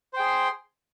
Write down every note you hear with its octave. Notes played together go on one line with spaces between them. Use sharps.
G#4 C5 G5 C6